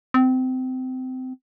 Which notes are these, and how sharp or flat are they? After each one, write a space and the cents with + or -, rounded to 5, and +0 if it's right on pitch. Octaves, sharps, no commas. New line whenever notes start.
C4 -25